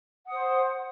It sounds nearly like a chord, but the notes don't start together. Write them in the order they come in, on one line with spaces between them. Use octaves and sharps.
F#5 D#6 C5